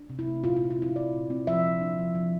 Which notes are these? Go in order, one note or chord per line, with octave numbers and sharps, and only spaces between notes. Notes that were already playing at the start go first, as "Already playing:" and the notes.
Already playing: D4
C3
E4
A3
A#2 F4
A#2 F4
F4
C4 E4
A#2 D5
A#2
C4
F3 E5
F3
D4
F3
F3